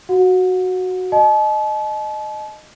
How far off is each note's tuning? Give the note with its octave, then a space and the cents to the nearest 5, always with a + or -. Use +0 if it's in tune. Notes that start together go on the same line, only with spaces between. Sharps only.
F#4 +0 F#5 -35
D#5 -15 A5 -40